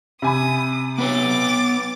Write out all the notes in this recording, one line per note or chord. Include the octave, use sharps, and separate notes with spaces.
C3 G#5 B5 D#6
B3 B4 C#5 D6 A6